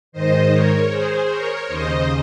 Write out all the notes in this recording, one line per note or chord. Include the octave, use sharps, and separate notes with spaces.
G#2 D#3 C5 D#5
A#4 C#5
G#4 C5
A#4 C#5
D#2 C#3 C5 D#5